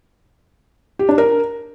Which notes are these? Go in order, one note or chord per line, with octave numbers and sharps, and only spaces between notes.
G4
D4
A#4